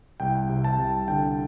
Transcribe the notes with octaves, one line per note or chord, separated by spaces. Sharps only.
C2 G5
C3
A5
C2
D3 G5